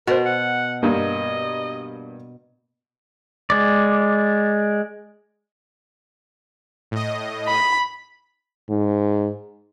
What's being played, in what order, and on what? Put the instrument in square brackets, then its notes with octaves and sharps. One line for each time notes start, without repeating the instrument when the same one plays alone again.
[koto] B2 [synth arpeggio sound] F#4 C5 [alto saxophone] A#4
[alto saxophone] F#5
[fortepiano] G2 A#3 [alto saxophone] D#5
[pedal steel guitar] G#3 D5
[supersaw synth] A2 D#5
[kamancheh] B5
[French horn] G#2